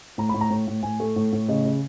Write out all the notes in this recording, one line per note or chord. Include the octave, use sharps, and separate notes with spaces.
A2 A#5
A2 B5
A#5
A2
A2
A2 G#5
A3
A2
A2
C#3 D#5
C#3